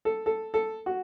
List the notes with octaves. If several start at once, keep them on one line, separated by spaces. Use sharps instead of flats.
A4
A4
A4
F#4